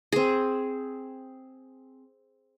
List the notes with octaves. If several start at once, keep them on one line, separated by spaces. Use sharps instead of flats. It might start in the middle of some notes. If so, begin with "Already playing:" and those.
C4 G#4